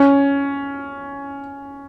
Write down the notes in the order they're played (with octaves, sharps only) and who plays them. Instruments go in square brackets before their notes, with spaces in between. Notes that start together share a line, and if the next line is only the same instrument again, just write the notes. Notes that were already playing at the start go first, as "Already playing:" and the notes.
Already playing: [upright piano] C#4